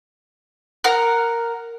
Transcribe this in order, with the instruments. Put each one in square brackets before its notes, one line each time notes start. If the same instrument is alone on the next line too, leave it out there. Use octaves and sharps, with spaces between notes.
[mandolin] A#4 F#5 F6